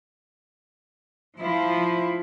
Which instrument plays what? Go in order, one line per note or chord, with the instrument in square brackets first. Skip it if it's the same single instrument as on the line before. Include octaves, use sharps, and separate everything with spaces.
[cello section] F3 F4 [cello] E4